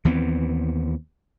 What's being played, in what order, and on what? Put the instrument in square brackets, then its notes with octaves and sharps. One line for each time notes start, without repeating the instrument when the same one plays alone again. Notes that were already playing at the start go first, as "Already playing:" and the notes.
[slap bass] D#2 E3 B3 C4